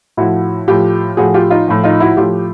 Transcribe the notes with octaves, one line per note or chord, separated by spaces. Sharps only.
A2 F3 E4 F#4
A2 F3 F4 G4
A2 F3 F#4 G#4
F4 G4
D#4 F4
A2 F3
D#4 F4
E4 F#4
A2 F3 F4 G4